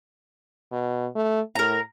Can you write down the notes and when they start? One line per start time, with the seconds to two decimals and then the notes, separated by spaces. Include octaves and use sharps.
0.72 B2
1.15 A3
1.55 A2 A#4 A#5